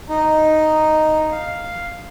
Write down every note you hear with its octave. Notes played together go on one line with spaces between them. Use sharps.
D#4
F5